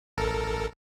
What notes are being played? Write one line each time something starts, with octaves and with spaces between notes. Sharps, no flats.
A1 A4 A#4